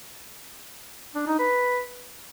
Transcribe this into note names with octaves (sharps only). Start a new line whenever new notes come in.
D4
D#4
B4